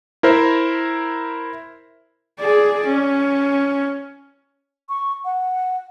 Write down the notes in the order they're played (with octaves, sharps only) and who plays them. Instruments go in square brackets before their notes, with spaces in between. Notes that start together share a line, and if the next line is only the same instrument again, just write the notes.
[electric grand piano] E4 A#4 C5 E5
[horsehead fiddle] G#4 D5
C#4
[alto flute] C#6
F#5